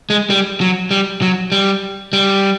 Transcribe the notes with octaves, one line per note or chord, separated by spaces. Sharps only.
G#3
G3
F#3
G3
F#3
G3
G3